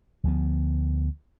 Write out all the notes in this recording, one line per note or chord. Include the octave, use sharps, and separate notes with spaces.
D2 F3 B3